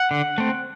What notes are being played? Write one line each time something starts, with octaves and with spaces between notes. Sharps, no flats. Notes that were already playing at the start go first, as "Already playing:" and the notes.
Already playing: F#5
D3
A3 C4